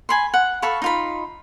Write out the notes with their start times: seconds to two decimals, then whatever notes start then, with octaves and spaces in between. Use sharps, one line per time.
0.09 G#5 B5 C6
0.34 F#5
0.62 A4 F5 B5 C#6
0.82 D#4 F4 B5